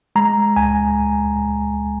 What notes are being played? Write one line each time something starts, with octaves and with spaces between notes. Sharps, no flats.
G#3 A#5
C#2 G#5